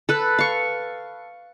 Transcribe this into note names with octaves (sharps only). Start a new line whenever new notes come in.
A4 B4
F5 C#6